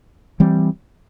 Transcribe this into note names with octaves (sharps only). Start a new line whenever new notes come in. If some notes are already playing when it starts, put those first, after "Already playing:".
E3 G3 C4